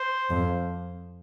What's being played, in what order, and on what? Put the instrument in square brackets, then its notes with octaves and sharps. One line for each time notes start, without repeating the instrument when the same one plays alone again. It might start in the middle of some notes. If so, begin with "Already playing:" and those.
Already playing: [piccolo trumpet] C5
[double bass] F2